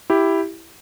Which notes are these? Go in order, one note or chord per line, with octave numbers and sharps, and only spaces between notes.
E4 G4